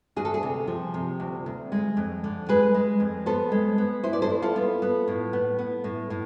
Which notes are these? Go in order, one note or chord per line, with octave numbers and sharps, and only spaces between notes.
D2 G#4
A4
G#4
C3
F3
C3
D2
D2
G#3
F2
D3
G#3 G#4 B4
G#3
F2
B3 A4 C5
G#3
B3
E4 C5
D5
A4 C5
E4
F4 A4
B3
B3
A2
B3
B3
A2
A2